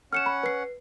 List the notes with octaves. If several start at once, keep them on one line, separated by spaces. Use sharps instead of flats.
C#4 F#5 F6 C#7 E7
B5
B4 C7